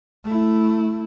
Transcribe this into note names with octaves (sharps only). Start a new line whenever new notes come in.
A3 E4